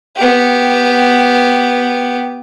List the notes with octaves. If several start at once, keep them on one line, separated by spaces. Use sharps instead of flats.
B3 G4